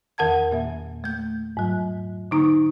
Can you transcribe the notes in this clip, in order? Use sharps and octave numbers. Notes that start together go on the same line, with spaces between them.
E2 D#3 A#4 F#5 A5 G#6
A#2 A#3 E5
A3 G6
G#2 F#3
D3 A#3 D#4 A#5 C#6 D#6